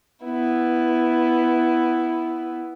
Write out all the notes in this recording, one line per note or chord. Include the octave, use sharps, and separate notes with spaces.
B3 E4